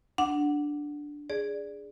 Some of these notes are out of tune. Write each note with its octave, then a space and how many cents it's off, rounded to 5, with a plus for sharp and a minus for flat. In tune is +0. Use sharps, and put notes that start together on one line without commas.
D4 +0 F#5 +0
G#4 +0 D5 +0